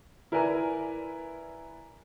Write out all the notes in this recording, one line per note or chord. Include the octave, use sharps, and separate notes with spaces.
E4 A#4 B4 D5 G#5 A#5